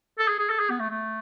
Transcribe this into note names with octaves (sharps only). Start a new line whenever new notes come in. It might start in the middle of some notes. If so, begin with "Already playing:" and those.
A4
G#4
G#4
A4
G#4
B3
A3
A3